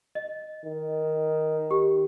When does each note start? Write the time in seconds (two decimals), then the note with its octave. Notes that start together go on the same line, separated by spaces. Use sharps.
0.15 D#5
0.64 D#3
1.71 G4